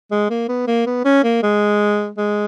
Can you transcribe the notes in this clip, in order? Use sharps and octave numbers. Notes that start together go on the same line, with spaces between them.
G#3
A#3
B3
A#3
B3
C#4
A#3
G#3
G#3